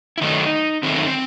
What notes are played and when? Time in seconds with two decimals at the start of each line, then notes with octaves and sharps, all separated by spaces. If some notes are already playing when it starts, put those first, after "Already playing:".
0.18 E4
0.21 D#3 F#3 A3 D#4
0.83 D#3 F#3 A3 C4
0.95 D#4
1.07 C4